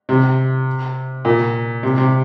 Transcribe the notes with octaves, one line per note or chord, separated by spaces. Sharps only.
C3
A#2
C3
C3